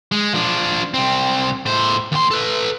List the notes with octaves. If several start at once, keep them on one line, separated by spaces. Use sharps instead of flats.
G#3
F3 D4
C2 C4
A2 C5
D#2 C6
A4 B4